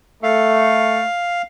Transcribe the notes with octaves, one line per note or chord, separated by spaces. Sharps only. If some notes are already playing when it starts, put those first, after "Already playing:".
A3 F5